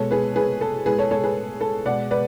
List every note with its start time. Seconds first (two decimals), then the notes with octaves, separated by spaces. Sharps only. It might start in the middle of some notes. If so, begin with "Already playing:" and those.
Already playing: B2 G#3 A4 C#5
0.11 G#4 B4
0.36 G#4 B4
0.61 A4
0.86 A2 G#3 G#4 B4
0.98 A4 C#5
1.11 A4 C#5
1.24 G#4 B4
1.61 A4
1.85 B2 G#3 D5 F#5
2.11 B4 D5